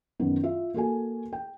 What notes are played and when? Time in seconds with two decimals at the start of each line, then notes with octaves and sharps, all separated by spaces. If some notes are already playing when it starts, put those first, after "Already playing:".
0.20 F#2 D#3 B3
0.43 F4 E5
0.74 A#3 F#4 A4 G#5
1.33 G5